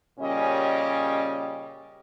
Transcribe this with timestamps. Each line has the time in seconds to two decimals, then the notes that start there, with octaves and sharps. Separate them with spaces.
0.19 A#2 C#3 G3 C#4 D#5